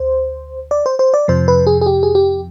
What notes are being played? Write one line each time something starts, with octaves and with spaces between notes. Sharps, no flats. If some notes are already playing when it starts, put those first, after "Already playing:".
Already playing: D2 C5
D5
C5
C5
D5
F2 C3 F3 C5
B4
G#4
G#4
G4
G#4
G4